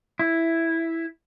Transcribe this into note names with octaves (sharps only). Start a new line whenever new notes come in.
E4